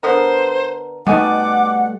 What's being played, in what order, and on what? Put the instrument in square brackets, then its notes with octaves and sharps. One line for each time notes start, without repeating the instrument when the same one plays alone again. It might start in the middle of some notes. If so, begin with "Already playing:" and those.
[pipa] D3 B3 A#4 [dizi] C5
[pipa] B2 D#4 G#5 [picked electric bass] G3 A3 [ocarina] F#5 [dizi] D6